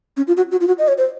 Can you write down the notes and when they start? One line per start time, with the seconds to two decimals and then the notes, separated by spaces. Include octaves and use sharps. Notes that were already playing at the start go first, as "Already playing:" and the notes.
0.17 C#4
0.27 F4
0.37 F#4
0.52 F#4
0.61 F4
0.68 F#4
0.78 D#5
0.88 C#5
0.98 C5